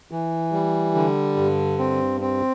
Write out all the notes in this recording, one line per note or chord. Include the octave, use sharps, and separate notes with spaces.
E3
G3
D3
G2
C4
C4